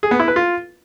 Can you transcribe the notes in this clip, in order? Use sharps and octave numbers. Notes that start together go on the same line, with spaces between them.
G#4
B3
E4
B4
F4